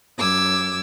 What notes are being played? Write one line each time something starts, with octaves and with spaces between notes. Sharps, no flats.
F#2 D6 E6 G#6